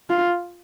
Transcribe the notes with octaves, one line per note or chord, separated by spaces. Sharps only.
F4